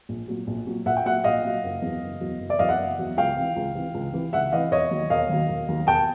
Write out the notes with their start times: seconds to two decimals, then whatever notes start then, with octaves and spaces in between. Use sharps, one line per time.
0.09 A#1
0.28 A#2 F#3
0.47 A#1
0.67 A#2 F#3
0.86 A#1 E5 F#5
0.97 G5
1.06 A#2 F#3 E5 F#5
1.24 A#1 D#5 F5
1.45 A#2 F#3
1.64 F#1
1.82 E2 B2 F#3
2.02 F#1
2.21 E2 B2 F#3
2.40 F#1
2.49 D5 E5
2.59 E2 B2 F#3 D#5 F5
2.69 E5 F#5
2.80 F#1
2.99 E2 B2 F#3
3.17 C#2 F5 G5
3.37 C3 E3
3.56 C#2
3.75 C3 E3
3.94 C#2
4.13 C3 E3
4.33 C#2 E5 F#5
4.52 C3 E3 D#5 F5
4.71 E1 C#5 D#5
4.91 D#2 D#3 F#3
5.10 E1 D#5 F5
5.29 D#2 D#3 F#3
5.49 E1
5.68 D#2 D#3 F#3
5.87 E1 G5 A5